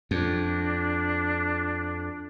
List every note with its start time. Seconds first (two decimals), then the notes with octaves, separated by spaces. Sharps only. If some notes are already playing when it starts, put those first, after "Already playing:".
0.11 F2 D4